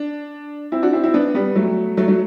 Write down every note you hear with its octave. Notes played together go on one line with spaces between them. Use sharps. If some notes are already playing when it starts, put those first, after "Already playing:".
Already playing: D4
C4 E4
D4 F#4
C4 E4
C4 E4
B3 D4
G3 B3
F#3 A3
F#3 A3
F#3 A3